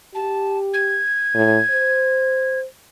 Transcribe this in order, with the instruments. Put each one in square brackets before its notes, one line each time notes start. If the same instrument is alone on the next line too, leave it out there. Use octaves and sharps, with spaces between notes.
[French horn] G4 [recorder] A5
[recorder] G#6
[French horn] A2
C5